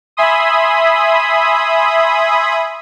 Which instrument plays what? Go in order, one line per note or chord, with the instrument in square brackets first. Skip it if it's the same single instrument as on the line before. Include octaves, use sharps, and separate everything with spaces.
[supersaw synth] E5 G#5 B5 C6 D#6